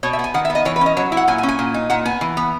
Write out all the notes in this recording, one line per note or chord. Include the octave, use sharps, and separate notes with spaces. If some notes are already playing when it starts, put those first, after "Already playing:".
B2 C#5
E5
B3
G#5
D#3 F#5
E5
B3
D#5
E3 C#5
B4
C#4 D#5
F#3 C#5
E4
F#5
A#2 G#5
G#5
C#4
G#5
A#2
D#4
A#2 F#5
B3 G#5
E3
B3